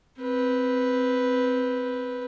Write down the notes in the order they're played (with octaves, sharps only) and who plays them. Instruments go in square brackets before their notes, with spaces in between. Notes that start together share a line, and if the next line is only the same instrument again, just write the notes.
[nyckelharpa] C4 B4